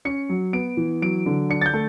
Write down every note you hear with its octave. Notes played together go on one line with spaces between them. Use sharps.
C#4 C#7
F#3
B3 D7
E3
F#3 D7
D3
D4 C#7
A6
G6
A3